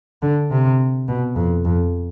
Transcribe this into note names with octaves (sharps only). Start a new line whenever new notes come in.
D3
C3
B2
F2
F2